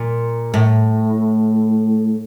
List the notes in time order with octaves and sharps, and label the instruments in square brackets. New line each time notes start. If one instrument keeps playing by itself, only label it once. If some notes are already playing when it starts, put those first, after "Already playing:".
Already playing: [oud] A#2
A2